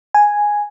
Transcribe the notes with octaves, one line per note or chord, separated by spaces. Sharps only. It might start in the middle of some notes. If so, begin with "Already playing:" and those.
G#5